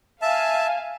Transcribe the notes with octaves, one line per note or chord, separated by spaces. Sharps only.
E5 F5 G#5 A5